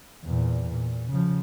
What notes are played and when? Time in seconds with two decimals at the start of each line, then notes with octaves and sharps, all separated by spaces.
0.25 E2 A#2
0.70 A#2
1.10 C#3 F3